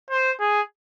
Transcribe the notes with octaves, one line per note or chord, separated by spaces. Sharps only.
C5
G#4